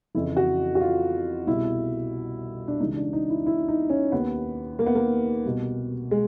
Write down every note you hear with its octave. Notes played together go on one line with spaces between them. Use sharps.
F2 C#3 E3 E4
F#4
F#4
F4
C2 B2 E4
D4
C#2 C#3 E3 D#4
D4
D#4
E4
E4
D#4
C#4
D#2 D#3 B3
A#3
B3
A#3
C2 B2
G#3